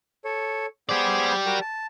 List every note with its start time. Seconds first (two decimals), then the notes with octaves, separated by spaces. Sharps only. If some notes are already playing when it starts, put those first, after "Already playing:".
0.25 A4 C#5
0.89 B3 G4 G#4 C5 D5
1.46 F#4 A#4 G5
1.61 A5